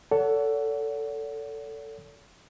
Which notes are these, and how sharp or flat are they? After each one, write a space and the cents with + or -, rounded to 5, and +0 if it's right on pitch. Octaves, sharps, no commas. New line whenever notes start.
A4 +15 C#5 +45 F#5 +0